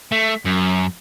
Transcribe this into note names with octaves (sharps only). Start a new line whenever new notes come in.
A3
F#2